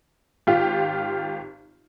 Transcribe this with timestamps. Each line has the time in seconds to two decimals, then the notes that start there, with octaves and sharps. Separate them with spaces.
0.47 G#1 F4 G4